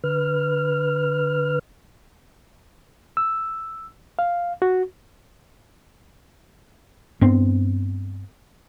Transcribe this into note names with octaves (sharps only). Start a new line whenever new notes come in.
D3 B4 F6
E6
F5
F#4
G2 B3 C4